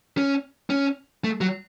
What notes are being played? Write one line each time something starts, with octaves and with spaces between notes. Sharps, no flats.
C#4
C#4
A3
F#3